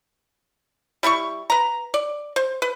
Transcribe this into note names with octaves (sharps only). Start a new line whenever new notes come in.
G3 E4 B4 C#6
B4 A#5
D5
C5
B4